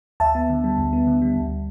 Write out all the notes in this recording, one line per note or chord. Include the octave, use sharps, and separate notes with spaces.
D2 E5 A5
B3
D3
G3
D2
B3
D3
G3
D2